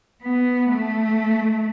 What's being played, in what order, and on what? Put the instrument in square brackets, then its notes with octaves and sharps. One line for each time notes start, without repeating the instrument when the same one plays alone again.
[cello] B3
A3